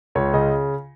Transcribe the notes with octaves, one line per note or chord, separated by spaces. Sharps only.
C#2 C#5
C#3 D#5